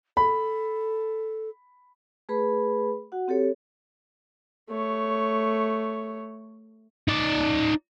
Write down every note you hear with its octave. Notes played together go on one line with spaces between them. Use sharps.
A4 B5
A3 G#4 B4 B5
F#4 F#5
C4 G4 A4 C#5
A3 C#5
D#4 D5